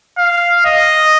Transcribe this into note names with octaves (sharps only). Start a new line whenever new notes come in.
F5
D#5